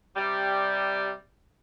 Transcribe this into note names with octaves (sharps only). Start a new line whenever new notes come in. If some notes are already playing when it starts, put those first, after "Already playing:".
C3 G3